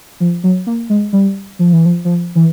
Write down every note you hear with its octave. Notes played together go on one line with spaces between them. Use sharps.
F3
F#3
A#3
G#3
G3
F3
E3
F3
F3
E3